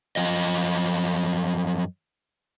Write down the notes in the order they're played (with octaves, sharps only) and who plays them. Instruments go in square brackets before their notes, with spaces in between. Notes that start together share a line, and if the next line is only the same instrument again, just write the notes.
[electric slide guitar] F#2 F3 D#5